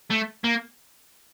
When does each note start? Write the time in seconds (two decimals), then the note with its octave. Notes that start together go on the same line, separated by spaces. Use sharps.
0.11 A3
0.44 A#3